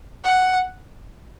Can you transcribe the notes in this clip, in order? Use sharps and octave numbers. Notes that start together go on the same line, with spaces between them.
F#5